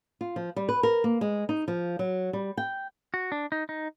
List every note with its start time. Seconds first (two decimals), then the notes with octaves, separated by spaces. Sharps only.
0.21 F4
0.36 F3
0.56 G3
0.69 B4
0.83 A#4
1.04 A#3
1.21 G#3
1.49 D#4
1.68 F3
1.99 F#3
2.33 G3
2.57 G5
3.14 F#4
3.32 D4
3.52 D#4
3.69 D#4